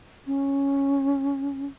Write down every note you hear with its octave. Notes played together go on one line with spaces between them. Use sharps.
C#4